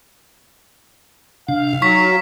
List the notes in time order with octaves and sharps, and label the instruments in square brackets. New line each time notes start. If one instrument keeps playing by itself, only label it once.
[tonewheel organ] C3 D4 [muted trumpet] F5
[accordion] F#3 [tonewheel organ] D#4 [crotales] C#6 B6